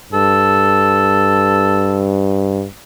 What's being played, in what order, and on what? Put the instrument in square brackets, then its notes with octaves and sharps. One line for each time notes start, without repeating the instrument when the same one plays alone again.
[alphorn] G2 [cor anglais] A4